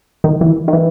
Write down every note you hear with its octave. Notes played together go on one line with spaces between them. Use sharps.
D#3
E3
D#3
E3